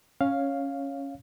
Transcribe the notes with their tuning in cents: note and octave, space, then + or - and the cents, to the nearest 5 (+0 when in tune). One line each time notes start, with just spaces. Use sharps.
C#4 -5 C#5 +0 F5 +0